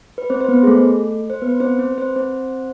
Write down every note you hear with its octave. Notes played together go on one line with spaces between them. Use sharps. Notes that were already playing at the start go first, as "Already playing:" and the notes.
B4
C4 C5
C5
B3 B4
G#4
A3 A4
C5
B3 B4
C4 C5
C4 C5
B4
C4 C5
C4 C5